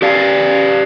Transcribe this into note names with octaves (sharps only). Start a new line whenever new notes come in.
G4 D5 F5